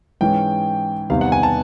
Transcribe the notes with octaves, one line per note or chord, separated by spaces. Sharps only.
G#2 E3 G#3 C#4 G5
E2 C3 D#3 G3 B3 F5
F#5
G#5
A5